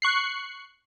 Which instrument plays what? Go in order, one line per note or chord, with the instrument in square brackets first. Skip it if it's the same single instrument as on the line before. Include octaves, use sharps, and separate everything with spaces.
[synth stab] C#6 F#6 C7